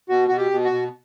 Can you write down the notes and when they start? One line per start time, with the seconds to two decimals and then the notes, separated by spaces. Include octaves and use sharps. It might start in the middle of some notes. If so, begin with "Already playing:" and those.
0.09 B2 F#4
0.28 B2 F#4
0.37 G4
0.51 B2
0.64 F#4
0.71 B2